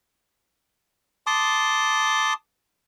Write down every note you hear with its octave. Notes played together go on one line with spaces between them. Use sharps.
A5 C6 D6 D#6